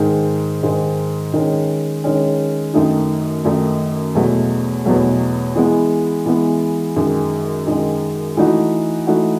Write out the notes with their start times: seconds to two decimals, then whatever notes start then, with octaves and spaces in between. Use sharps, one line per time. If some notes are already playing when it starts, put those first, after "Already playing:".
Already playing: G#2 D#3 G#3
0.63 G#2 D#3 G#3
1.34 D#3 G#3 C#4
2.04 D#3 G#3 C#4
2.74 F#2 D#3 A3 D#4
3.45 F#2 D#3 A3 D#4
4.15 E2 B2 F#3 A3
4.85 E2 B2 F#3 A3
5.55 E3 G#3 B3
6.26 E3 G#3 B3
6.96 F#2 D#3 G#3
7.67 F#2 D#3 G#3
8.37 E3 A3 D#4 F#4
9.07 E3 A3 D#4 F#4